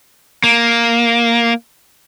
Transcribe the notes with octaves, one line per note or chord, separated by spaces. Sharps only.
A#3